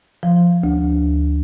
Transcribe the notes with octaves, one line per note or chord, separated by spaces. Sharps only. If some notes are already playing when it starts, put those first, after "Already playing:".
F3
D2